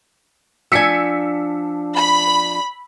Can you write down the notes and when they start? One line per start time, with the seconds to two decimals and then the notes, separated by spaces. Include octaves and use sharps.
0.72 F3 D4 G#5 E6 B6 C#7
1.96 B5